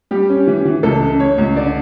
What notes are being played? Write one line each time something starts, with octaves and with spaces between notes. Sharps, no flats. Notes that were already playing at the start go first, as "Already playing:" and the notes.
G3 G4
C#4
E3
E3
C#2 A4
C#3
C#3 C#5
C#2
D3 D5